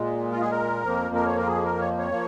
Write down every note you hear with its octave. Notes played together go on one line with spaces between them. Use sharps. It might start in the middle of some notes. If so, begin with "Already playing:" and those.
Already playing: A#2 G#3
F4
G#4
A#4
F2 F3 A#3
A#4
C#5
F4 A#4
G#4
A#4
C#5
C#5
F3 A#3